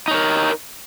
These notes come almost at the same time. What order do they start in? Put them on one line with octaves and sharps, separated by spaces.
D#4 C#5 A#4